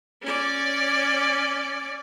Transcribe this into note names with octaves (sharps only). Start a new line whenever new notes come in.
C#4 D5